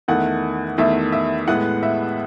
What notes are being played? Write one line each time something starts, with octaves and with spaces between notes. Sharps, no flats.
E2 D#3 A3 F#5
E2 D#3 A3 E5
E5
A2 G#3 B3 F#5
E5